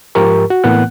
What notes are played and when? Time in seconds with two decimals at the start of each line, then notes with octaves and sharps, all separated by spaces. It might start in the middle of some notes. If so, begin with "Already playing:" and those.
0.15 G#2 F3 G4 A#4 C#6
0.50 F#4
0.64 A2 E3 A#3 B3 F#5 F#6